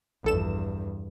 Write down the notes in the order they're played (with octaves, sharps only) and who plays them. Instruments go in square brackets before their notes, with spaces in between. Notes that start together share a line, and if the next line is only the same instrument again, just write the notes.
[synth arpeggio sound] A#1 A4 E7 [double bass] E2 G2